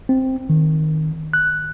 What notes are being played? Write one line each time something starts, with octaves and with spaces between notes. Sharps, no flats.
C4
D#3
F#6